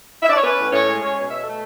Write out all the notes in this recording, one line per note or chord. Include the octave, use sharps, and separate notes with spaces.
E5
D5
C#5
C#4 B4
A2
A2 C#5
G#3
C#4 C#5
B2 C#5
B2 E5
A3 A4